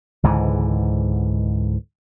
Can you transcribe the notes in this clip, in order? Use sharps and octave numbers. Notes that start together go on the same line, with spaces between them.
C#2 G#2 D3 E3